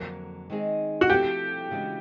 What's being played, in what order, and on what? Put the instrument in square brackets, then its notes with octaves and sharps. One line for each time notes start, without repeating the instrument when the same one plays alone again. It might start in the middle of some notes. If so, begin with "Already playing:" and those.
Already playing: [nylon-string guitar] F2 D3 F#3 A#3
D#3 G#3 C4 D#4 G#4
[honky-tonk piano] F#4
[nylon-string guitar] F3 A3 C4 E4 A4 [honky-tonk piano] G4
[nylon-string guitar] C#3 E3 G#3 B3 D4